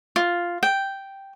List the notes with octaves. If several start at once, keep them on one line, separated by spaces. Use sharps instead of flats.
F4
G5